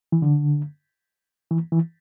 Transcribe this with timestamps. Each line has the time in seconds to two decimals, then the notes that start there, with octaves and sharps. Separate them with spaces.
0.12 E3
0.22 D3
1.51 E3
1.72 E3